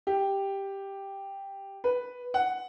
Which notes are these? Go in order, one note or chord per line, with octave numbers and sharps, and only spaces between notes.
G4
B4
F#5